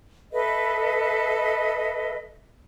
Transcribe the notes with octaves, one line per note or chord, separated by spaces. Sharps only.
A4 B4 D#5 E5